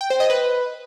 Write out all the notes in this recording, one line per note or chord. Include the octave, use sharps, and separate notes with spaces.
G5
C5
D#5
B4